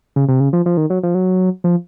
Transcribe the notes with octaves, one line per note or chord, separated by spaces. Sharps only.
C#3
C3
C#3
F3
F3
D#3
F#3
F3
F#3
F3